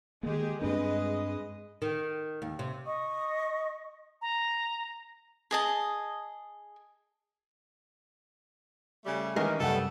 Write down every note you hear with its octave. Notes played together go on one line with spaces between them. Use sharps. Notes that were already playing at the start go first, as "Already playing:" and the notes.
D#3 G#3 A#3 G4 G#4
G2 G#3 C4 D4 B4 D#5
D#3
D#2
C3
D#5 C#6 D#6
A#5
G#4 D#5 A5
C#3 G3 A3
D#3 E3 G#3 A#3 C#4
C2 F#2 G3 A3 B3 A4 F#5